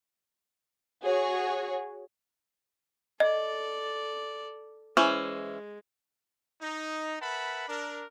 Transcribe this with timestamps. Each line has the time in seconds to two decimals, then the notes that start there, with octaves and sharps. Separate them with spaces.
1.04 F#4 G#4 C#5
3.20 A4 D5 D#5
4.97 E3 G#3 C#4 C5
6.61 D#4
7.21 A#4 B4 E5 F#5 A5 B5
7.68 D4 A#4